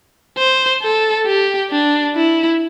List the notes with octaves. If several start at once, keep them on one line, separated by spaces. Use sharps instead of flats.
C5
A4
G4
D4
E4